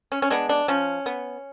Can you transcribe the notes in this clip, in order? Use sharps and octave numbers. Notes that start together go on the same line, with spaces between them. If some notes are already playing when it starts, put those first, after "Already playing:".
C#4
C#4
G#3 B3 D4
D4
F3 C#4
B3